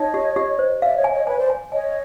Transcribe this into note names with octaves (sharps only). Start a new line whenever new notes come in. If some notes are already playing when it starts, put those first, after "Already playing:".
Already playing: D#4 C#5 D#5
G4
G4
C5
D5 E5 F5
C#5 D#5
G#5
C#5 D#5
B4 C#5 G#5
C5 D5
G#5
C#5 D#5 G#5